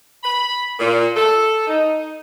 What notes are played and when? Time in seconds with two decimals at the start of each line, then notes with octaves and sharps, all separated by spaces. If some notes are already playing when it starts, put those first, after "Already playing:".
0.24 B5
0.79 A#2
1.16 A4
1.68 D#4